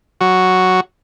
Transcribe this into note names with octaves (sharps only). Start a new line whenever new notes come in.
F#3 F#4